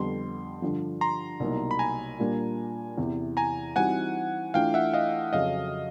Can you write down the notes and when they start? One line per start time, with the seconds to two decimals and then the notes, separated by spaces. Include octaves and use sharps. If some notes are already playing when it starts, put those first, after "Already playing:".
Already playing: F2 D3 G3 B3 C6
0.62 G2 D3 F3
1.01 A#5 C6
1.40 C2 B2 F#3 A#3 D#4
1.71 B5
1.79 G#5 A#5
2.19 A#2 G3 A#3 D4 F4
2.98 E2 C3 E3
3.37 G#5 A#5
3.76 E3 G3 C4 D#4 F#4 F#5 G#5
4.54 E3 A3 D4 F4 F5 G5
4.74 E5 F#5
4.94 D#5 F5
5.33 F2 C#3 F#3 D#5 F5